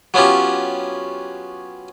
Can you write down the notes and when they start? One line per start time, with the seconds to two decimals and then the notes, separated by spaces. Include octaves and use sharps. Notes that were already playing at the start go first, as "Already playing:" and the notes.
0.14 F#3 B3 C#4 F4 G4